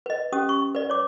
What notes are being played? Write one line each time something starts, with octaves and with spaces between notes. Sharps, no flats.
B4 D#5
C#4 G4 D#6
C#6
B4 D5
C#5 D6